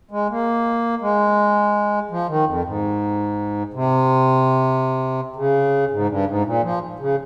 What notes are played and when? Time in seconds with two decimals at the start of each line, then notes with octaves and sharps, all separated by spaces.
0.11 G#3
0.30 A#3
1.02 G#3
2.11 F3
2.29 D#3
2.46 F2
2.65 G#2
3.74 C3
5.36 C#3
5.91 G#2
6.09 G2
6.27 G#2
6.45 A#2
6.63 F3
6.99 C#3